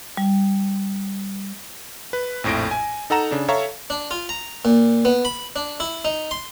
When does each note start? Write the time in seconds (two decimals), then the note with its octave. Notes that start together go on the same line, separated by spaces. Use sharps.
0.17 G3
2.13 B4
2.44 A#1 F2 A2 A#6 D7
2.71 G#5
3.10 D#4 A4 F#5 A#5 E7
3.31 C#3 D4
3.48 A4 C#5 E5 F5 A#5 C#6
3.90 D4
4.11 F4
4.29 A#5
4.65 A#2
5.05 B3
5.25 B5
5.56 D4
5.80 E4
6.05 D#4
6.31 C6